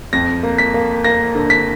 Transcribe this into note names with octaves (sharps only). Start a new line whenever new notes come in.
F2 A#6
A#3
B6
A#3
A#3 A#6
D3
B6